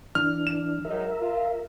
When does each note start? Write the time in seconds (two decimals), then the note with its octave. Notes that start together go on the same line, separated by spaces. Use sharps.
0.15 E3 D4 F6
0.47 E7
0.85 F#3 G#3 D#4 A#4 E5
1.20 F4